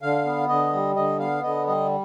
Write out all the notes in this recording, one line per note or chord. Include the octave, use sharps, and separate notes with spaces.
D3 F5
B3
D3 D#5
G3
D3 D#5
B3 F5
D3 D#5
G3 D#5